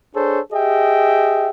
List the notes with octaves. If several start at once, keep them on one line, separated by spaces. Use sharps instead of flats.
D4 G#4 A4 C5 C#5
G4 G#4 D#5 E5 G5